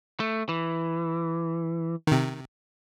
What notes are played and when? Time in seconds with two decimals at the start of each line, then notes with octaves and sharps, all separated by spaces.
0.20 A3
0.49 E3
2.07 C3 D#3